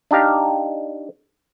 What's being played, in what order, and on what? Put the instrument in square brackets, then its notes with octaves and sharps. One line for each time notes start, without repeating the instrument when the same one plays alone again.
[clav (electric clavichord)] D4 D#4 G4 F5